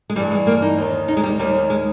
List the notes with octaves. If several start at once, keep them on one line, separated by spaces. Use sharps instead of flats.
G#3
G2 E3 G3
G#3
A#3
D#4
D#2 D#3
D#4
G#3
G3
D#2 D#3 G3
G#3